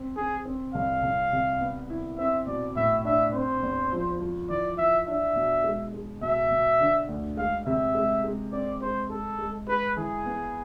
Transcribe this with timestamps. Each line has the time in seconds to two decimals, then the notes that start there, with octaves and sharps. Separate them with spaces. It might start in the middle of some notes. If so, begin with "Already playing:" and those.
Already playing: C4
0.16 C4 G#4
0.45 C4
0.74 C2 F5
1.03 C2
1.32 C3
1.61 B3
1.90 E4
2.18 C4 E5
2.47 B2 D5
2.76 A2 E5
3.04 D4 E5
3.33 C4 C5
3.62 E2
3.92 F3
4.20 F3
4.49 E3 D5
4.78 E3 E5
5.07 D4 E5
5.36 B2
5.64 G#3
5.94 G#3
6.21 B2 E5
6.51 B2
6.79 D3
7.08 D2
7.37 G#3 F5
7.66 C3 E5
7.95 G#3
8.24 G#3
8.52 C4 D5
8.82 G#3 C5
9.10 G#3 A4
9.39 G#3
9.67 G#3 B4
9.97 E3 G#4
10.26 B3